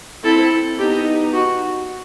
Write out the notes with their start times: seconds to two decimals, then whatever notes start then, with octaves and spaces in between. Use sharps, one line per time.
0.24 C4 E4 A4
0.78 B3 D#4 G4
1.33 F#4